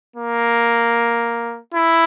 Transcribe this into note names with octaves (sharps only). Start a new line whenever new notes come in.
A#3
E4